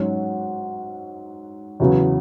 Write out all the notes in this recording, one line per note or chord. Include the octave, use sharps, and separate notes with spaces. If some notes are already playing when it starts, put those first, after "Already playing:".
Already playing: G#2 F#3 C#4 F#4
E2 C#3 F#3 B3 F#4